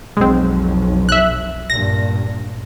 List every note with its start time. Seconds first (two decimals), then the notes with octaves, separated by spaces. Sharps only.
0.17 B1 F2 G#3 C4
1.09 E5 F#6
1.70 G2 A#2 A#6